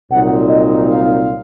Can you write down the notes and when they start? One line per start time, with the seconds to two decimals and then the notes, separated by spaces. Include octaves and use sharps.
0.10 C2 A#2 F#3 C4 D#4 F#5
0.49 D#5
0.88 F5